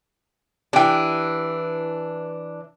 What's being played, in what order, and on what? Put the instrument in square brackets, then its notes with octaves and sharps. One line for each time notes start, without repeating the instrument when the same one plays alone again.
[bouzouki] E3 D4 [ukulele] G4 G5